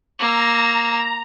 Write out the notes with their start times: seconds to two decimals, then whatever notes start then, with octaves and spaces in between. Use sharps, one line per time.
0.20 A#3 A#5 E6